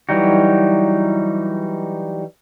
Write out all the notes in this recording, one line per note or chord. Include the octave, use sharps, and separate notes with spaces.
E3 F#3 G3 D#4 F#4